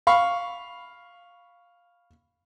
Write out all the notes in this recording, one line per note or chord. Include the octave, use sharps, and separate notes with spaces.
F5 B5 C#6 F6